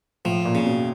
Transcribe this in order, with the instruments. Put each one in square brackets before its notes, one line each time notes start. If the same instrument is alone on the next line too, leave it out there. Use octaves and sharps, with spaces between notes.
[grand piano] A2 [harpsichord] F3
[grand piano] A#2
[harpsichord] C#3
[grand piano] B2